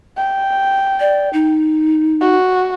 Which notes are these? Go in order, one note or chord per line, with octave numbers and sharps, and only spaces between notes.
G5
D5
D#4
F#4